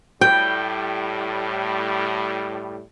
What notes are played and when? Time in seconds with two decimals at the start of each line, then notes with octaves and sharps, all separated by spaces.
0.21 A2 G3 G5